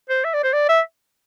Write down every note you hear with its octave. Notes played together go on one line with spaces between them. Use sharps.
C5
E5
D5
C5
D5
E5